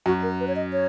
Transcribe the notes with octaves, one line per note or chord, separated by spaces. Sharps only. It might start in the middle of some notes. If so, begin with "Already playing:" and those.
F#2 F#4
A#4
B4
C#5
D#5
C#5